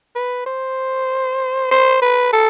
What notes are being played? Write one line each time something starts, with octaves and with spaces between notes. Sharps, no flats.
B4
C5
C5
B4
A4